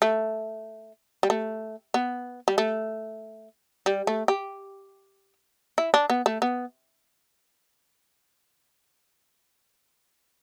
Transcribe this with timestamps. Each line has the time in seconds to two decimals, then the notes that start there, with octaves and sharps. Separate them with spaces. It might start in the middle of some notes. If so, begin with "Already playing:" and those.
0.02 A3
1.23 G3
1.30 A3
1.94 B3
2.48 G3
2.58 A3
3.86 G3
4.07 A3
4.28 G4
5.78 E4
5.94 D4
6.10 B3
6.26 A3
6.42 B3